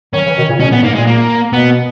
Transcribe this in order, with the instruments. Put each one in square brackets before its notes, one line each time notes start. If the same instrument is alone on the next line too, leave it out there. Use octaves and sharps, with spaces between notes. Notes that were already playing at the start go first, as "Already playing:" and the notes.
[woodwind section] D#3 F#3 [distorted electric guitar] C#4
[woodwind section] C#3 E3
B2 D#3
A#2 C#3
[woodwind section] B2 [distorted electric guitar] C#4
[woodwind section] A#2 [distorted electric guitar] B3
[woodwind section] G#2 [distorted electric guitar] A#3
[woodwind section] A#2 [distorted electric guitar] G#3
[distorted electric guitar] A#3
[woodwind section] B2 [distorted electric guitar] B3